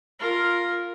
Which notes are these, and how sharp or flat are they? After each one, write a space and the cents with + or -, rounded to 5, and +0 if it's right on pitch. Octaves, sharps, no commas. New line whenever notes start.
F4 +0 A#4 +0